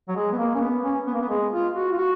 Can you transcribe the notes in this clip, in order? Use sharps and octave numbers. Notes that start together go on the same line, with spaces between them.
F#3
G#3
B3
A#3
C#4
B3
C#4
B3
A#3
B3
G#3
F4
F#4
F4
F#4